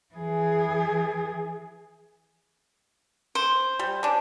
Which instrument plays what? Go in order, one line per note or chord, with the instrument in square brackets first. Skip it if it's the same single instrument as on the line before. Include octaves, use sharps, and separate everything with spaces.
[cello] E3 G#4
[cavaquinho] C5
[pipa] G3
C#4 D4